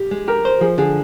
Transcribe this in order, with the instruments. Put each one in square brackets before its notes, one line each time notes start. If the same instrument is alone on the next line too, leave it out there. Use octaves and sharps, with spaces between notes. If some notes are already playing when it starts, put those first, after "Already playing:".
Already playing: [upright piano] G4
[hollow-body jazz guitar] G#3
[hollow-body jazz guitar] G4 [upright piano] A#4
[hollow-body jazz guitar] C5
[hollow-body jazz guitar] F3 [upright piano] G#4
[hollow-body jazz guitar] D3 [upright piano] G#4